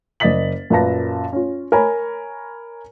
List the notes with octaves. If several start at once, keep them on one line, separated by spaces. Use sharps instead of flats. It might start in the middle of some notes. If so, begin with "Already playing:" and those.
F#1 D5 D#5 A6 B6 F#7
F#2 A#2 B4 A5 A#6
C#4 F4
A#4 C#5 G#5 A#5 B5